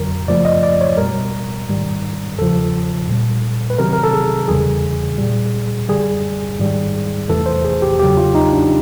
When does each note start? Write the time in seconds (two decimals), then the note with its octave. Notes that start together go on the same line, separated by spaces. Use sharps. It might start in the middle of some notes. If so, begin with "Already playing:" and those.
Already playing: F2 D3 F#3 A#4
0.28 F#2 C#3 F3 A3 D5
0.45 D#5
0.63 D5
0.81 C#5
0.97 B2 G3 A#4
1.69 G#2 D#3 G3
2.38 E2 C#3 F3 A4
3.08 A#2 G3
3.70 B4
3.79 C3 D#3 F#3 A#4
3.93 A#4
4.04 A4
4.13 G#4
4.48 E2 C#3 E3 G3 G#4
5.18 A#2 G3
5.89 F#2 D3 G3 G#4
6.59 G#2 D#3 G3
7.29 E2 C3 E3 A3 A4
7.46 C5
7.65 G#4
7.82 G4
7.99 E2 C#3 F#3 G4
8.17 F4
8.35 D#4
8.52 D4